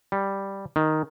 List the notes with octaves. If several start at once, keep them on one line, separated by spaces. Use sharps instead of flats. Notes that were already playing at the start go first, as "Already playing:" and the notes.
G3
D#3